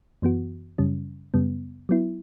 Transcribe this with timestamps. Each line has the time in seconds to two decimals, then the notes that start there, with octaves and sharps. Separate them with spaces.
0.22 F#2 E3 B3 F#4
0.78 F#2 C#3 G3 C#4
1.34 F#2 C#3 G3 B3
1.89 F#3 B3 E4